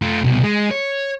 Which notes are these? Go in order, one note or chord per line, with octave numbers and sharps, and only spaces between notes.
A3 F4
C2 B2
G#3
C#5